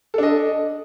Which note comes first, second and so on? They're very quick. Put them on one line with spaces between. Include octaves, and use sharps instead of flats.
A4 D4 D#5